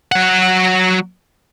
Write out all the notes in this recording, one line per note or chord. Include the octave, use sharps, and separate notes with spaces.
F#3 F#5